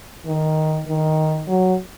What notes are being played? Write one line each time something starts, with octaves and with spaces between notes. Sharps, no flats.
D#3
D#3
F#3